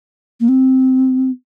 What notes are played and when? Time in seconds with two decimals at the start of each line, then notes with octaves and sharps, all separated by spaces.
0.40 A#3
0.49 C4